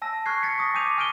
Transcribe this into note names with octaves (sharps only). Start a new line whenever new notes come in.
G#5 A5 E6 A#6
C#6 F6 F#6 G#6 C7
A6 B6 C#7
C#6 D#6 A#6
G#5 D6 G6 D#7 F7
G#5 F6 G6 D7 D#7 G7